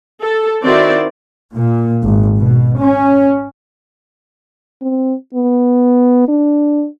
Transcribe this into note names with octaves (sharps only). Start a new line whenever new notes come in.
A4
D#3 C4 E4 F#4 C5 D5
A#2
G#1
B2
C#4
C4
B3
D4